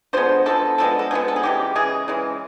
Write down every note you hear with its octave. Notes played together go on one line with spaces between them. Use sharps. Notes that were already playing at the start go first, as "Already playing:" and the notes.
D3 F3 G#3 B3 C5
D3 F3 G#3 B3 A4
D3 F3 G#3 B3 A4
A4
D3 F3 G#3 B3 G#4
A4
G#4
C#3 E3 G#3 G4
C#3 E3 G#3 G#4
C#3 E3 G#3